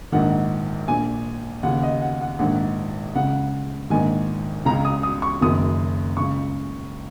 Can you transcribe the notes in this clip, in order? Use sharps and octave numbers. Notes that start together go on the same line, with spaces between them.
A#1 G#2 D#3 F#5
A#1 A#2 G#5
D#2 C#3 F#5
D#5
F#5
F#5
A#1 G#2 D#3 F#5
C#2 C#3 F#5
A#1 G#2 D#3 G#5
C#2 C#3 A#5
D#6
D#6
C#6
F#1 F#2 D#3 D#6
C#2 C#3 C#6